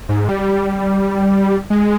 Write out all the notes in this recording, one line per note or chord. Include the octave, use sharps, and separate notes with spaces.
G#2
G3
G#3